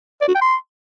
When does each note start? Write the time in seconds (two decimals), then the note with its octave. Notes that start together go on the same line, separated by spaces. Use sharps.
0.21 D5
0.28 F#4
0.35 G5
0.41 C6